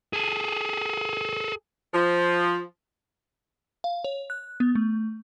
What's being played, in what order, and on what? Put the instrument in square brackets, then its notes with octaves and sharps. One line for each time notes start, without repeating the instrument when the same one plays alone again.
[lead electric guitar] G#4 A4
[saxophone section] F3
[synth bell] F5
C#5
F#6
B3
A3